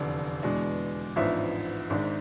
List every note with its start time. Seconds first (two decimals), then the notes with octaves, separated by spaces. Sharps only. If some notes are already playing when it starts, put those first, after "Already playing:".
Already playing: F1 E2 D3 D5
0.43 E2 B2 G#3 D4
1.16 A1 G#2 F3 B3 D4 E5
1.90 G#1 G#2 G#3 D4